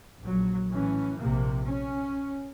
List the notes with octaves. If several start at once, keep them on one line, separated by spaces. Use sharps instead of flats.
A#1 F#3
A2 E3 C#4
A#1 C3 A#3
C#4